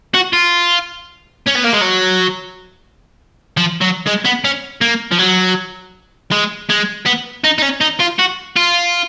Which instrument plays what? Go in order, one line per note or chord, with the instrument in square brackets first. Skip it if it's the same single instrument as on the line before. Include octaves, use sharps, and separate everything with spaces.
[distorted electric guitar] F#4
F4
C#4
B3
A#3
G#3
F#3
F3
F#3
G#3
B3
C#4
A#3
F3
F#3
G#3
G#3
B3
D#4
D#4
C#4
D#4
F4
F#4
F4